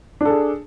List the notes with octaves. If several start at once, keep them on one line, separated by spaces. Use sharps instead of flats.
D4 G#4 A4